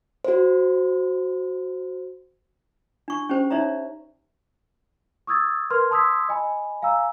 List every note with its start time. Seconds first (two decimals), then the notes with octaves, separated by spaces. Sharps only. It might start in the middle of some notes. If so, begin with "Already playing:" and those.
0.24 F#4 C5
3.08 D4 C#6
3.29 C#4 G4 C5
3.50 D#4 C#5 D5 E5 A#5
5.27 C#6 D#6 E6 G#6 A6
5.70 A#4 B4 C6 F6 G#6
5.91 A5 C6 D#6 E6 G#6 B6
6.29 D#5 G#5 B5
6.82 F5 G#5 A#5 E6